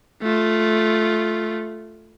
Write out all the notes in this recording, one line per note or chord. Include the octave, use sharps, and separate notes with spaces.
A3 F4